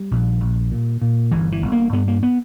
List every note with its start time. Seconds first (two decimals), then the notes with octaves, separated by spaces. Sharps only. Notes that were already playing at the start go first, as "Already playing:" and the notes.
Already playing: G3
0.11 A#1
0.41 A#1
0.71 A#2
1.02 A#2
1.32 G1 E3
1.52 E3
1.62 G1
1.72 A#3
1.93 G2 B3
2.08 A#3
2.23 B3